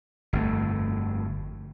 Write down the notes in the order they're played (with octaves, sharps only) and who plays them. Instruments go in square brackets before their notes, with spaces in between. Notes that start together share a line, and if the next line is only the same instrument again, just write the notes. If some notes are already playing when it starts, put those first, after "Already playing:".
[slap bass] G1 F2 A3